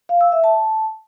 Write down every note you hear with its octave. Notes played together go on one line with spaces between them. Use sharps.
F5
E6
E5
A5